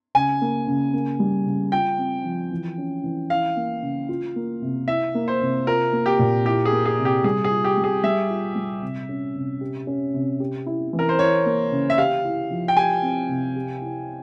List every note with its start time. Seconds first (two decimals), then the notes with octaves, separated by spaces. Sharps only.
0.15 C#3 G#5
0.42 A#3
0.67 C#3
0.94 A#3
1.20 G3
1.46 C#3
1.72 F4 G5
1.98 C4
2.24 F3
2.51 E3
2.78 C#4
3.04 E3
3.30 E4 F5
3.56 A#3
3.82 C#3
4.09 F4
4.36 A#3
4.62 C3
4.88 E4 E5
5.15 A#3
5.28 C5
5.41 C3
5.67 F4 A#4
5.93 A#3
6.06 G4
6.19 A#2
6.45 E4 G4
6.65 G#4
6.72 A#3
6.86 G#4
6.99 C3
7.05 G4
7.24 G3 G#4
7.44 G#4
7.51 F4
7.64 G4
7.77 G3
7.84 G#4
8.03 G3 E5
8.30 F4
8.56 G3
8.82 C3
9.09 C#4
9.35 C3
9.61 G4
9.87 C#4
10.14 C3
10.40 G4
10.66 E4
10.93 E3
10.99 A#4
11.09 C5
11.19 E4 C#5
11.46 A#3
11.72 C#3
11.90 E5
11.98 G4 F5
12.25 E4
12.50 F3
12.68 G5
12.77 G4 G#5
13.02 C4
13.29 C3
13.56 G4
13.82 E4